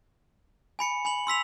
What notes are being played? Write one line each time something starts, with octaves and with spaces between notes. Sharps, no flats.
G#5 B5 C#7
G#5 B5 F#7
C6 E6 B6 F7